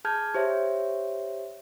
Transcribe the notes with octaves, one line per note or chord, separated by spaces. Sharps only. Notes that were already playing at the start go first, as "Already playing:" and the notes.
G#4 A5 F6 G6 G#6
G4 C5 C#5 E5